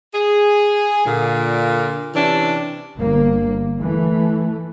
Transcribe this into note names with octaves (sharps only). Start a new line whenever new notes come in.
G#4
A#2 D3
C3 E3 C#4 D4
G1 A#3
E3 A3